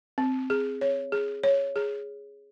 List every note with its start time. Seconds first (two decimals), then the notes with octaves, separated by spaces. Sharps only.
0.18 C4
0.50 G#4
0.81 C#5
1.12 G#4
1.44 C#5
1.76 G#4